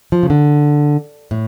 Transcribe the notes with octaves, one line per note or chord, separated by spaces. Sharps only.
F3
C#3
D3
A2